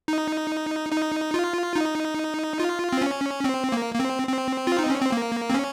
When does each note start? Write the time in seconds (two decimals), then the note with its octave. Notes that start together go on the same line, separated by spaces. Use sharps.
0.08 D#4
0.92 D#4
1.34 F4
1.76 D#4
2.60 F4
2.93 C4
3.01 C#4
3.44 C4
3.72 A#3
3.94 A#3
4.00 C4
4.28 C4
4.67 F4
4.79 D#4
4.90 C#4
5.01 C4
5.12 A#3
5.50 C4
5.54 C#4